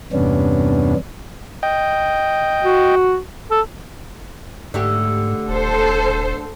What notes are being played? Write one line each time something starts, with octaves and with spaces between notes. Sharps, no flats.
E2 G2 C3 B3 C#4 D4
D#5 G5
F#4
A4
G#2 D3 A3 G4
D#1 A4 C5